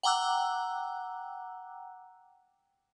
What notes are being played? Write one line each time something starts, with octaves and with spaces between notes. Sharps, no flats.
F#5 G5 A#5 D6 E6 F#6